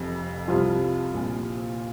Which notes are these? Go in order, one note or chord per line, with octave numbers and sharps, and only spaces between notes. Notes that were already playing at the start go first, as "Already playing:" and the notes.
Already playing: F1 F2 C3
C2 C3 F3 G3 F4
A#1 A#2 G3